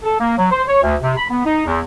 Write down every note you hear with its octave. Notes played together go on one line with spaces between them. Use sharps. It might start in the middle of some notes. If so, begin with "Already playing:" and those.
A4
A#3
F#3
C5
C#5
D2
C3
B5
B3
D#4
E2